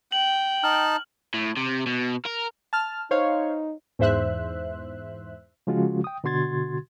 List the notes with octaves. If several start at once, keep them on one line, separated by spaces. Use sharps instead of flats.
G5 F#7
D#4 A5 F6
A2
C3
B2
A#4
A5 F6
D#4 C5 C#5 F5
E2 G#2 C5 E5 F#6
C#3 F3 G#3 C#4 F4 F#4
G5 D#6
B2 D3 F#4 C6 G#6 A6